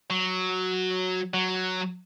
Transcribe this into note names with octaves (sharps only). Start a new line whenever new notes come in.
F#3
F#3